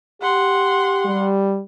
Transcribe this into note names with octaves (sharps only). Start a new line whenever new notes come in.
G4 F#5 C6
G3